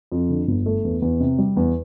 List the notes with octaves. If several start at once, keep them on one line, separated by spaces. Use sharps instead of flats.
F2
D3
G1
A3
E2
E2
C3
G3
E2